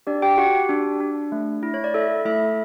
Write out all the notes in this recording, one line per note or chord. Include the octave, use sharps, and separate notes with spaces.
D4 G4 D5
G4 G5
F#4 G4 F#5
D4
D4
A3
E4
C#5
D5
E4 A4 E5
A3 E4 E5